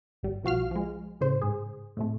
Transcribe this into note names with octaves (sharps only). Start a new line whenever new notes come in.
G#1 G3
B1 F3 F#4 F5 F6
F3 G#3
A2 C#3 C5
G#2 G#4
A2 C3 A3